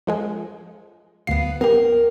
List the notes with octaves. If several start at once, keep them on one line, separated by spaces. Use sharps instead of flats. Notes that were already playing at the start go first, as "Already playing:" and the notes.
F3 G#3 G#4
D2 B3 F5 C7
B3 G4 A#4